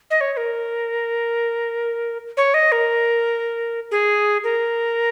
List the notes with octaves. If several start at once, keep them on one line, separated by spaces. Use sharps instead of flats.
D#5
C#5
C#5
A#4
C#5
D#5
A#4
G#4
A#4